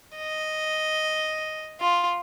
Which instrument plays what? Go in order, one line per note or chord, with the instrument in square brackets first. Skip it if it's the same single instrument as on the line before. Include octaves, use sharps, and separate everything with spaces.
[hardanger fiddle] D#5
F4